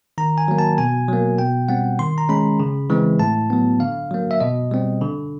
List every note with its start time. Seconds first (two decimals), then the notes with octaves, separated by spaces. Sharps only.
0.18 D#3 A#5
0.38 G#5
0.48 F#3 A#3
0.59 A5
0.78 B2 G#5
1.08 F#3 A#3
1.39 B2 G5
1.69 G3 C4 F#5
1.99 D#3 C6
2.18 A#5
2.29 G#3 C#4 B5
2.60 C#3
2.90 E3 G#3 C4
3.19 A2 A5
3.50 F#3 B3
3.80 D3 F5
4.11 F#3 A#3
4.31 E5
4.41 B2 D#5
4.71 G3 C4
5.02 D3